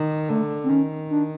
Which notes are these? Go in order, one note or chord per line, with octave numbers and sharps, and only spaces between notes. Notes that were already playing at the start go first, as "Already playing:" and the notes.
Already playing: D#3
D3 A3
C4
D#3 C#4
D4